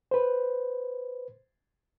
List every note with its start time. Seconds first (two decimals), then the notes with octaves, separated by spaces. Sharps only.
0.11 B4 C5